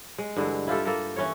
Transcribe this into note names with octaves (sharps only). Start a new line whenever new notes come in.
G#3
G2 D3 E3 G#3
E4 F4 G4 A4
A#3 A4 A#4
E3 C#4 E4 C#5